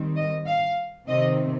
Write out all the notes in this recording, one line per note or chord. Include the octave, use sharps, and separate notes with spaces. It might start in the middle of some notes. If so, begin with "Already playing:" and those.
Already playing: D#3 G3 C4
D#5
F5
C3 D#3 C4 D#5